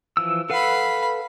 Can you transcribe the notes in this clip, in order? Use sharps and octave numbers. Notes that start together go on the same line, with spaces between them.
E3 F3 E6
A4 B4 F5 F#5 B5